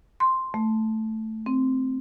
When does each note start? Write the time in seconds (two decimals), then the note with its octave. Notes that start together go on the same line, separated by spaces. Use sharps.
0.20 C6
0.54 A3
1.46 C4